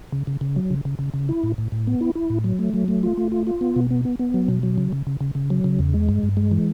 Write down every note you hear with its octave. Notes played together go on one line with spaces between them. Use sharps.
C#3
C#3
C#3
F#3
C#3
C#3
C#3
C#3
E4
A2
A2
A2
B3
E4
E4
A2
F#3
A3
F#3
A3
F4
A3
F4
F4
B3
B2
B3
B3
B3
F#3
B2
F#3
C#3
C#3
C#3
C#3
C#3
F#3
C#3
E2
G#3
G2
G2
G#3
E3